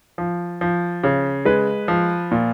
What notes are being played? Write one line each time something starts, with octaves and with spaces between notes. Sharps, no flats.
F3
F3
C#3
G#3 B4
F3
A#2